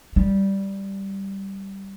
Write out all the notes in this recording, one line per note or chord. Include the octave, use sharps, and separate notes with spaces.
G3